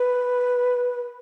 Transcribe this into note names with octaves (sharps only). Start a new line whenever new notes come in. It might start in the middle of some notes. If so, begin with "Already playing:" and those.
Already playing: B4